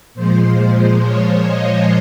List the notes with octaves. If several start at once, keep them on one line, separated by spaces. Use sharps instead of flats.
A#2 F3 G#3 C5
C5
C#5
D#5